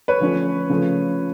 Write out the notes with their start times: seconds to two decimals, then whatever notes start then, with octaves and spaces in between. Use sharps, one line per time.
0.08 B4 C#5
0.20 D3 F3 A3 C#4
0.70 C#3 F3 A3